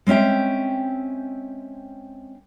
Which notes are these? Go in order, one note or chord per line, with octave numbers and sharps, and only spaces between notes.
G#3 C4 C#4 E5 G5